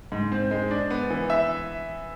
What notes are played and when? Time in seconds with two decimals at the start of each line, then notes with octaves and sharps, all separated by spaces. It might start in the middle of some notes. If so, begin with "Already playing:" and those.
0.12 G#2
0.32 C4
0.51 G#3
0.71 D4
0.90 B3
1.10 E3
1.30 E5